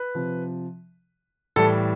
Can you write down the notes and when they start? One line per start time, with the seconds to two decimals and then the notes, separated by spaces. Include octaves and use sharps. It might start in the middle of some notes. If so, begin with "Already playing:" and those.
Already playing: B4
0.15 C3 F3
1.56 A2 E3 G3 A4